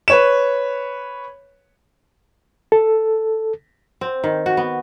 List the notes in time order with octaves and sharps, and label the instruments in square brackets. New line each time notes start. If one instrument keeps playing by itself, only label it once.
[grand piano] B4 C#5 E7
[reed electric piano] A4
[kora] C4
D#3
F#4
B3